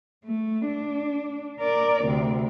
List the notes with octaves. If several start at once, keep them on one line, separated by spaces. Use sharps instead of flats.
A3
D4
A#4 D5
D2 C3